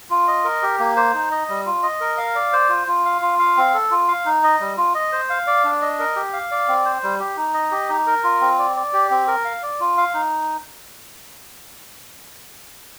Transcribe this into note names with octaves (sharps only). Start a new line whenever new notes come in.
F4
D#5
A#4
G4
A#3
C5
D#4
D#5
G3
F4
D#5
A#4
F5
D5
C5
F4
F4
F5
F4
F5
C4
A4
F4
F5
D#4
D#5
G3
F4
D#5
C5
F5
D5
D4
D#5
A#4
G4
F5
D5
C4
C5
G3
G4
D#4
D#5
G4
D#4
A#4
F4
C4
D5
D5
G4
C4
A#4
F5
D5
F4
F5
D#4